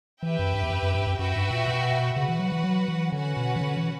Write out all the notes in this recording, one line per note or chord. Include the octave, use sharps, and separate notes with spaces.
E3 G4 B4 E5 G5
F#2
G2
E2
F#2
F#2
G2
F#2
F#2 F#4 B4 E5 G5
G2
A#2
B2
C#3 F#4 B4 F#5
E3
F#3
E3
F#3
E3
D3 C#4 F#4 B4 F#5
B2
E3
D3
E3